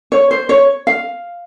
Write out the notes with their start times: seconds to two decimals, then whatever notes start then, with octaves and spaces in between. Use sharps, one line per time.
0.12 C#5
0.31 C5
0.49 C#5
0.87 F5